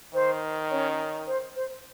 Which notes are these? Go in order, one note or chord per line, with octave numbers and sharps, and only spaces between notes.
D#3 C5
C#4 C#5
C5
C5